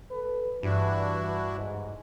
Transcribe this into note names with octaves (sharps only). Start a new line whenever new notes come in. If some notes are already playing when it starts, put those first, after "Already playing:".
A4 B4
G2 E3 D4 E4 F#4
G#2